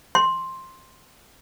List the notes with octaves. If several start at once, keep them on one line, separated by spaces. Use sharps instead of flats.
C6